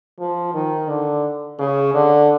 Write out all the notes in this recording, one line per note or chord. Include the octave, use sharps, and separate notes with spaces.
F3
D#3
D3
C#3
D3